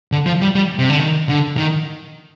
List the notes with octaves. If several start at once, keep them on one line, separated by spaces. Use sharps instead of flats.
D3
F3
G3
G3
C3
D3
D#3
D3
D#3